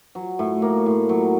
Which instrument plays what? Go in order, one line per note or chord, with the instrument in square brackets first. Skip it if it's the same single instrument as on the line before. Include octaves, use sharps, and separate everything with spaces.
[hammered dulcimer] F#3
A2
A#3
A2
F#3